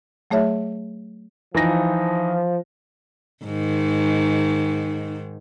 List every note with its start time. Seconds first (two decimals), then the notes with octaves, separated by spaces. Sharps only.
0.31 F#3 A3 G#4 C#5 E5
1.55 E3 F3 D#4 A#6
3.45 G#2 D#3